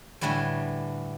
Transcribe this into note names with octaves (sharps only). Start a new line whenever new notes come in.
A2 D3 E3 G3 A3